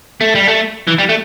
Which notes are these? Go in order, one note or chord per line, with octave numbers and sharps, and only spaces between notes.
A3
G3
A3
E3
G3
A3